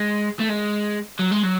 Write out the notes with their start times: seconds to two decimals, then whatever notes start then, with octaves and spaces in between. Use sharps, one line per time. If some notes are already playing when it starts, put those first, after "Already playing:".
Already playing: G#3
0.40 A3
0.50 G#3
1.20 F#3
1.32 G#3
1.43 F#3